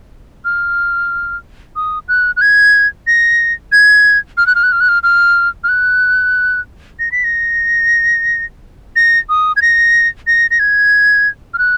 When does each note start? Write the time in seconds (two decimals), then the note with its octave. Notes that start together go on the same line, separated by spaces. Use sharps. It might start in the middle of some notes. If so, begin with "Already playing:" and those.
0.45 F6
1.76 D#6
2.08 F#6
2.36 F#6
2.41 G#6
3.07 A#6
3.72 G#6
4.37 F6
4.47 F#6
4.55 F6
4.63 F#6
4.72 F6
4.80 F#6
4.89 F6
5.03 F6
5.64 F6
5.69 F#6
6.99 A#6
7.12 B6
7.24 A#6
8.96 A#6
9.29 D#6
9.56 G#6
9.62 A#6
10.27 A#6
10.51 A#6
10.59 G#6
11.54 F6
11.58 F#6